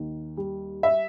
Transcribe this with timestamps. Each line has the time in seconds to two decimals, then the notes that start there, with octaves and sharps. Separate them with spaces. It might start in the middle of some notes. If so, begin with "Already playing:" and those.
Already playing: D#2 D#3
0.37 G3
0.83 E5